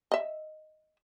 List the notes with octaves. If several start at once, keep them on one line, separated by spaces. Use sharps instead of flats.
D#5 E5